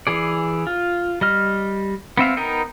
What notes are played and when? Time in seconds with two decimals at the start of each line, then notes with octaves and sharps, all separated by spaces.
0.07 E3 G#4 D5
0.67 F4
1.21 G3 D#5 F6
2.17 B3 C4 E5 F5
2.37 B3 D#4 A#4 G5